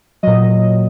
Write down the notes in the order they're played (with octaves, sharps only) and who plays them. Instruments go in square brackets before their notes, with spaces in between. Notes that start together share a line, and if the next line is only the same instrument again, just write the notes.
[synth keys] A#2 F#3 D#5